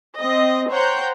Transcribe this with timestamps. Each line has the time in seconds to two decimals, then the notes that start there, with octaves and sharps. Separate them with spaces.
0.20 C4 D#5
0.71 C5 C#5 F#5 G5 A#5 G6